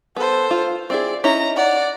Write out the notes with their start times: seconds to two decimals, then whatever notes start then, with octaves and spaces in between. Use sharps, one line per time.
0.16 B3 A4 C5
0.51 F4
0.90 C4 E4 G#4 D5
1.24 C#4 D#4 E4 A#5
1.56 D5 F#5